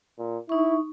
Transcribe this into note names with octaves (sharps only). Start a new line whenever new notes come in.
A#2
D#4 E4 C#6